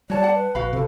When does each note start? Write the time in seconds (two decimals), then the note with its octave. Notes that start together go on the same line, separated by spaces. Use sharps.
0.10 G3 F#4 C#5 D5 A5
0.23 F#5 A5
0.35 B4
0.55 A#1 F#4 F5 B5
0.73 C3 A4